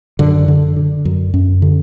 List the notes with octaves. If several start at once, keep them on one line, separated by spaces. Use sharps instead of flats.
F#2 D3
D3
D3
F#2
F#2
D3